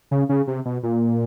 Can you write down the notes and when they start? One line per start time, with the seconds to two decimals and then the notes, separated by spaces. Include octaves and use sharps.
0.11 C#3
0.29 C#3
0.47 C3
0.65 B2
0.83 A#2